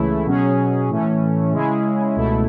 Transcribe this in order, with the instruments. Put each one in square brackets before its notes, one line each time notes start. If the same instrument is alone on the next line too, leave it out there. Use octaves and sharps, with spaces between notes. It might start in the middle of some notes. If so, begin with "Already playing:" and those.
Already playing: [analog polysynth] C#2 C#3 E3 A3 E4
B2 F#3 C#4 G#4
A2 E3 A3 C#4
C#3 G#3 C#4 E4 G#4
C#2 B2 A3 E4